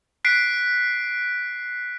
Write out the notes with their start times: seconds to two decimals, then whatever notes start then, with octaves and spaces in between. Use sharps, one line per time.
0.25 F#6 B6 C7 D7